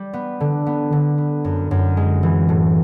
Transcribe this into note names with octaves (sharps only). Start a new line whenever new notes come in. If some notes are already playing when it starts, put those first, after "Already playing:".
Already playing: G3
B3
D3
B3
D3
B3
F#2
F#2
G#3
E3
A2